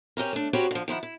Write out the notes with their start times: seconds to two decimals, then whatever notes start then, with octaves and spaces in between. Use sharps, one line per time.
0.17 C4 C#4 G4 A#4
0.33 A3 D4
0.53 C4 F#4 G4 A#4 B4 C#5
0.71 D3 F3
0.88 D#3 F3 E4 F#5
1.03 E4